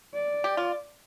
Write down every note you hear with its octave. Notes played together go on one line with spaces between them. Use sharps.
D5
G4
F4